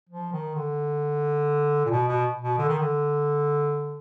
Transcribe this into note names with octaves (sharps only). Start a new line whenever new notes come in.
F3
D#3
D3
A#2
B2
B2
B2
D3
D#3
D3